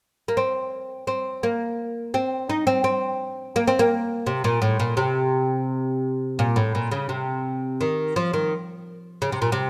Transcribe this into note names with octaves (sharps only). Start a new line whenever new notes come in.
A#3
C4
C4
A#3
C4
D#4
C4
C4
A#3
C4
A#3
C3
A#2
A2
A#2
C3
A#2
A2
A#2
C#3
C3
D#3
F3
D#3
C#3
C3
A#2
C3